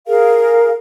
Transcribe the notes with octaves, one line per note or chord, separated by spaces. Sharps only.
G#4 A#4 F5